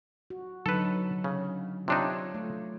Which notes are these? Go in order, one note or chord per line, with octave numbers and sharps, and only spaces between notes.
F#4
D3 F#3 D#4 A4 B4
C#3
C3 D4 D#4 F4 C#5
A3 F4